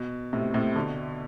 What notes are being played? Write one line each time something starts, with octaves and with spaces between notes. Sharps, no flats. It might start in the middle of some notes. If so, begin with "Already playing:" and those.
Already playing: B2
A2 C3
A2 C3
B2 D3